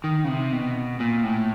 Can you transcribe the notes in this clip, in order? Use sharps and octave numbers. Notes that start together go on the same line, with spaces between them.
D#3
C#3
C3
B2
A#2
A2